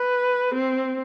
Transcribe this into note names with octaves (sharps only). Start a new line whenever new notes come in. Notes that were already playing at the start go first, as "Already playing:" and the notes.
Already playing: B4
C4